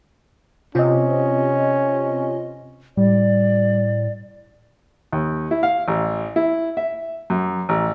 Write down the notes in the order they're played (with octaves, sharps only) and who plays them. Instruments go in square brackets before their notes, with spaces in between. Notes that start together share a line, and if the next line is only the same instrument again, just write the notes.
[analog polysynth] C3 [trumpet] C#4 [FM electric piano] F4 D#5
[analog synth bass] A2 [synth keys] G3 [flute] D5
[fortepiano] D#2
E4
F5
A1
E4
E5
F#2
A1